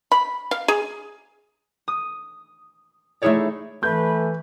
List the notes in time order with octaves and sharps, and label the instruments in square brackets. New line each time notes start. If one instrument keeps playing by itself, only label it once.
[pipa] B5
F5
G#4
[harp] D#6
A3 D#4 E4 G#4 C#5 D5
[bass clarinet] E3 [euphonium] A3 [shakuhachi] B4 [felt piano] G6